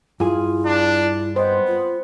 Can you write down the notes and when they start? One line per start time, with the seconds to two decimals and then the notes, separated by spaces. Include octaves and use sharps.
0.20 G2 E4 F4 G#4
0.66 D4
1.36 B3 C5 D#5
1.67 F4